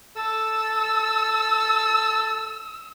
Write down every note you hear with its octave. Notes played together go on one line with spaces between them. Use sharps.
A4 E6